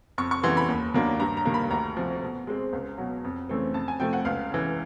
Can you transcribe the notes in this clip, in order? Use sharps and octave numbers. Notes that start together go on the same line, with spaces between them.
F2 C#6
C#6
C#3 E3 G3 B3 C6
B5
D#2
D#3 F#3 A#3 D4
G2 A#5
A#5
D#3 G3 A#3
B5
D2 A#5
C3 F3
B2
G#3 C4
C#2
B2 F#3
F2
C#3 E3 A3 C4
F2 A5
G#5
C3 F3 A3 G5
F#5
C#2 F5
C#3 E3